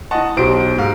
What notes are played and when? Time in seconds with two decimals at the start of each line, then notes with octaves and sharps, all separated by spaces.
0.11 E4 D#5 F#5 A5 C#6
0.37 B1 E4 F#4 G4 C5 D7
0.78 G#2 F5